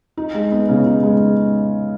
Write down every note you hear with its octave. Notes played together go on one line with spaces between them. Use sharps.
D#4
G#3
B3
C#3
D#4
G#3